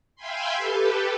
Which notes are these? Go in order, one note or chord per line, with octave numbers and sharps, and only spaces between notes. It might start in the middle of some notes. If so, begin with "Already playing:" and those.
E5 F5 G5 G#5 B5 C6
G4 A4 B4